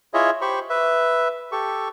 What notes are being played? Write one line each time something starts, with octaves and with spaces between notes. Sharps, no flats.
E4 F4 G#4 C#5 D#5 E5
G4 C5 B5 C#6
B4 E5
G4 A4 C#6